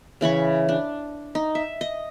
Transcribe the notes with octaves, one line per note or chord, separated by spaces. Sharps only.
C#3 E3 B5 C#6
D4
D#4
E5
D#5